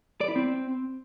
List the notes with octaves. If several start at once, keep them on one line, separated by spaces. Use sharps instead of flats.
D5
E4
C4